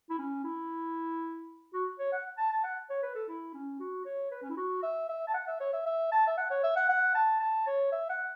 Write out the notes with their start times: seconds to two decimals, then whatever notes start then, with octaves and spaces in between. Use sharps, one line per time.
0.10 E4
0.18 C#4
0.45 E4
1.73 F#4
1.99 C#5
2.12 F#5
2.38 A5
2.50 A5
2.64 F#5
2.90 C#5
3.03 B4
3.15 A4
3.28 E4
3.54 C#4
3.80 F#4
4.05 C#5
4.31 B4
4.42 C#4
4.50 E4
4.57 F#4
4.83 E5
5.09 E5
5.28 A5
5.34 F#5
5.47 E5
5.60 C#5
5.73 E5
5.86 E5
6.12 A5
6.27 E5
6.38 F#5
6.50 C#5
6.63 E5
6.76 F#5
6.89 F#5
7.15 A5
7.40 A5
7.67 C#5
7.92 E5
8.10 F#5